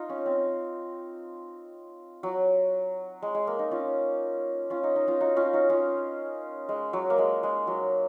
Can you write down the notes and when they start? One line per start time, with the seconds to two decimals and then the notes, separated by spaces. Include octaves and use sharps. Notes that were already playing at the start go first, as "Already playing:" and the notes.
Already playing: D#4 F4
0.09 C#4
0.26 C4
2.23 F#3
3.22 G#3
3.34 G#3
3.47 A#3
3.59 D#4
3.71 C#4 F4
4.70 C#4 F4
4.83 D#4
4.96 D#4
5.07 C#4 F4
5.20 D#4 F#4
5.36 C#4 F4
5.53 D#4 F#4
5.69 C#4 F4
6.69 G#3
6.93 F#3
7.10 A#3
7.18 G#3
7.43 G#3
7.67 F#3